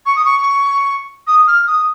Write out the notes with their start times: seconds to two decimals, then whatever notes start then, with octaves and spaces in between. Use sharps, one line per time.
0.06 C#6
0.16 D#6
0.25 C#6
1.27 D#6
1.47 F6
1.67 D#6